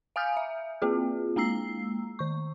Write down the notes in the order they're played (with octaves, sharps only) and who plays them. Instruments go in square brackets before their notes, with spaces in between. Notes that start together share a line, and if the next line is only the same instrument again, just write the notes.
[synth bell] F5 G#5 D#6 F6 G6
E5
A#3 C4 F4 G#4
G#3 A#3 A#5 E6 C7
D#3 C#6